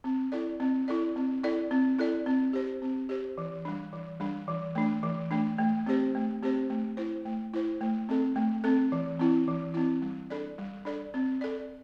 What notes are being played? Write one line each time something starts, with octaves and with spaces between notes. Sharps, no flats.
C4
E4 A4 D5
C4
E4 A4 D5
C4
E4 A4 D5
C4
E4 A4 D5
C4
G4 C5
C4
G4 C5
E3
G3 D4
E3
G3 D4
E3
A3 D4
E3
A3 D4
A3
C4 G4 C5
A3
C4 G4 C5
A3
E4 C5
A3
E4 C5
A3
C4 A4
A3
C4 A4
E3
C4 E4
E3
C4 E4
G3
D4 A4 D5
G3
D4 A4 D5
C4
A4 D5